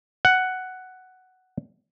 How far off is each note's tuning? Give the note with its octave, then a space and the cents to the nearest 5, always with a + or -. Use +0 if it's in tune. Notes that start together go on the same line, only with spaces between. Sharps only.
F#5 +5